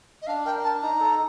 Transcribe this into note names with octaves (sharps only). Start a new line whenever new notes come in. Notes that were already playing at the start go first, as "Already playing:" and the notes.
D#5
D4 F5
A#4 G5
D4 A5
D#4 A#5
A4